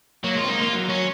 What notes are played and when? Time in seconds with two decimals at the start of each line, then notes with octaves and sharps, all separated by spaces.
0.24 F#3 A#3
0.36 G#3 F4
0.44 C4
0.48 A#3 D#4
0.61 A#3 F4
0.73 F#3
0.89 F#3 C#4